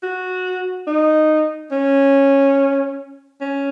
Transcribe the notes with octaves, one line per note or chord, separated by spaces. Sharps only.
F#4
D#4
C#4
C#4